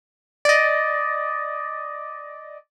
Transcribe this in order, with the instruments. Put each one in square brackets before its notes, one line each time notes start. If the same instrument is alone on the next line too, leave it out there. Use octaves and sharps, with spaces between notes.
[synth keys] D5 D#5